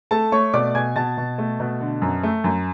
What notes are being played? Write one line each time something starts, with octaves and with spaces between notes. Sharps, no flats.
A3 A4 A5
A3 C#5 C#6
B2 D5 D6
B2 G#5 G#6
B2 A5 A6
B2
A3
B2
D3
F#2
A3
F#2